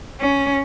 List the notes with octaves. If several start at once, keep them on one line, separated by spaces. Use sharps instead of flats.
C#4